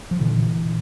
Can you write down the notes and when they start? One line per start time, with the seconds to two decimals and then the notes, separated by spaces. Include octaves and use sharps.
0.11 F3
0.20 A#2 D3 E3
0.64 A#2